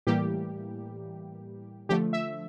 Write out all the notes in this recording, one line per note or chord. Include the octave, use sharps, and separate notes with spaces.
A2 E3 G3 A#3 G4
D3 F3 A3 G4
E5